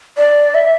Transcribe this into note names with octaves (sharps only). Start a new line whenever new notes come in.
D5
E5